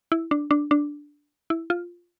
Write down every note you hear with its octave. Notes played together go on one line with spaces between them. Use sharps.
E4
D4
D4
D4
E4
F4